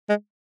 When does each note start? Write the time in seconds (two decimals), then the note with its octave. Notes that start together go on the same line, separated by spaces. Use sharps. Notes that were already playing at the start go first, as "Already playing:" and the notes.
0.09 G#3